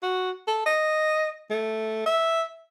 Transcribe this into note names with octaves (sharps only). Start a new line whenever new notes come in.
F#4
A4
D#5
A3
E5